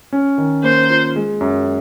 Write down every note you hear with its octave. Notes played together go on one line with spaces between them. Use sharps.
C#4
D#3
A#3 C5
F4
G#3
F#2